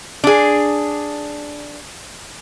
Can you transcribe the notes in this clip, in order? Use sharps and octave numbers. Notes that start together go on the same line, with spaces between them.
D4 G#4